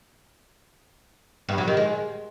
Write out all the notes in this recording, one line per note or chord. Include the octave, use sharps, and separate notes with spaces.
G2
F#3
D#3
G#3